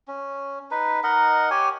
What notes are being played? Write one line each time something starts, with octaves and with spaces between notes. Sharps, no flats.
C#4
D#4 B4
D#4 A#4 D#5 F#5
G4 C#5 G#5